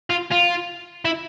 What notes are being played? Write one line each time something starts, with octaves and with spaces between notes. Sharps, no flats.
F4
F4
E4